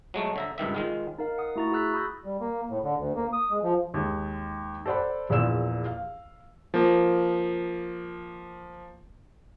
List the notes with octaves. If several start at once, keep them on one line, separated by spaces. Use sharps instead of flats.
F#3 G#3 A3
D3 E5 A#5
C#2 G2 D#3 E5
D#3 G#3 F4
D#4 A#4 F5
F#5 D#6
A3 E4 F#4 A#5 C#6 A6
F#4 G#4 E6 F#6 A6 B6
B5 D#6 E6 G6 A#6
G3
A#3
A2
D3
D2
A#3
D#6
G#3
F3
D#2 G#3
A4 C5 D5 F#5 B5
A#1 E2 A#2 D5 E6 E7
F5
F3 A#3